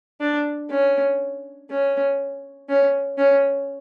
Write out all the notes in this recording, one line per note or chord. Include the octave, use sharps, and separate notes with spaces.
D4
C#4
C#4
C#4
C#4